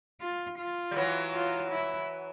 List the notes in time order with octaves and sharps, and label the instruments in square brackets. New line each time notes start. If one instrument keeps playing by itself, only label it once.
[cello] F4
F4
[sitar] G3
E3 F#3
[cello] F4
E4